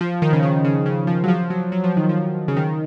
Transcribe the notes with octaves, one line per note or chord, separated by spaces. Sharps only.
F3
D#3
C#3
D#3
C#3
C#3
F3
F#3
F3
F#3
F#3
F3
D#3
F3
C#3
D#3